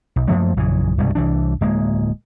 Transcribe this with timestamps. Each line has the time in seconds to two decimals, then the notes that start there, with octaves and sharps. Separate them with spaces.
0.16 B1
0.28 F#2 F3 A3 A#3
0.57 A#1 F#2 C#3 E3
0.98 C2 G2 B2 G#3
1.15 C2 E3 D4
1.61 D1 G#3 A#3